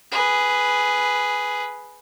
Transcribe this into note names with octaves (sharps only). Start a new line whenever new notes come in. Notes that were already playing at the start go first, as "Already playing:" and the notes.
G#4 B4